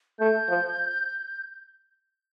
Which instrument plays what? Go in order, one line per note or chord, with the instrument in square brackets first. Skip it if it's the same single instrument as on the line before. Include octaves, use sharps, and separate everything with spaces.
[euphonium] A3 [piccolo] G6
[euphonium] F3